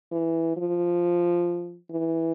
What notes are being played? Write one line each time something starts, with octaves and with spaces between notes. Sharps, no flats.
E3
F3
E3